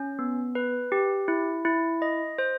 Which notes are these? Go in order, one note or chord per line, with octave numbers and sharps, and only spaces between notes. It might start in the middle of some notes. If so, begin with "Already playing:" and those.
Already playing: C#4
B3
B4
G4
E4
E4
D#5
C5